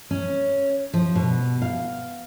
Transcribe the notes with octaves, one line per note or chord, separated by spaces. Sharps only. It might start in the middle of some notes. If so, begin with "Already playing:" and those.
C#4
F3
B2
F5